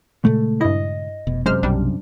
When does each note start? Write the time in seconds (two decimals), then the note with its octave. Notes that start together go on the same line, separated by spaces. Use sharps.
0.25 A#2 C#3 G#3 A3
0.61 G2 E4 D#5
1.27 F1 B2
1.46 F#2 C3 G#3 C5 F6
1.63 B1 G3 D4